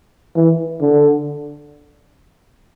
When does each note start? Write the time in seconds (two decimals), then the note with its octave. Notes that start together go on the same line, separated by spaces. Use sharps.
0.36 E3
0.81 D3